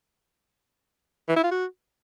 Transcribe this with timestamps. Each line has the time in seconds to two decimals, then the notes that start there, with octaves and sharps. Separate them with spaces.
1.29 E3
1.36 E4
1.44 F4
1.51 F#4